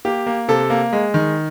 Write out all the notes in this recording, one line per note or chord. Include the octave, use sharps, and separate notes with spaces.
A#3 G4
A#3
C3 A4
A#3
G#3
D#3